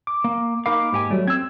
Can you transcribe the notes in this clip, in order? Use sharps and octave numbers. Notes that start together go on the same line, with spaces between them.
D6
A#3
A#3 D#4 A#4 F5 B5 D6
G#2 G4 G#5
F#3 G3 A3
C4 E6 G#6